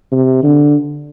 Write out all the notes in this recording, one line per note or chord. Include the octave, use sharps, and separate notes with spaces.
C3
D3